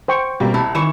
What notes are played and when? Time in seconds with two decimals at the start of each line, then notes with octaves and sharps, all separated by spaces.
0.08 C5 G5 C#6
0.40 B2 G3 A#3 C4
0.54 C2 E4 A5
0.75 D#3 E3 E4 C#5 E7